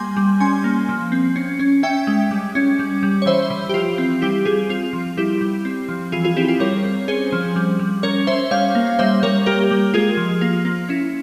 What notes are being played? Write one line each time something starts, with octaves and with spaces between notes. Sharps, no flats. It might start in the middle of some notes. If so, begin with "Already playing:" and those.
Already playing: G3 A#3 G#5 C6
G3
C#4 G#5 C6
A#3
F3
C4
C#4
C#4
C#4 E5 G5
G#3
G3
C#4
G3
G3
C#5
E3 C5 E5
E3
G4
F3 F4
C4
G3 E4 G4
G3 F4 G#4
C4 F4
F3
G3 E4 G4
G3
C4
F3
E3 F4 G#4
F4 G#4
C4 E4 G4
F4
G3 A#4 C#5
C4
C#4 G#4 C5
F3
G3
G3
C#4 A#4 C#5
C#4 C5 E5
G3 C#5 F5
A#3
G3 C5 E5
G3 A#4 C#5
A#3 G4 A#4
G3
G#3 F4 G#4
F3
A#3 F4
A#3
C#4 E4